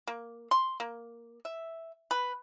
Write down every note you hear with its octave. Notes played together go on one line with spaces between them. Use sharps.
A#3
C6
A#3
E5
B4